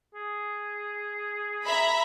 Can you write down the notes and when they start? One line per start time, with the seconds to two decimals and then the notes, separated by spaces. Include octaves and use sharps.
0.15 G#4
1.64 E5 A#5 B5